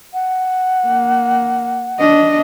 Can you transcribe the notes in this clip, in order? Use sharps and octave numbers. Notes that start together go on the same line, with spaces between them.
F#5
A#3
D4 D#5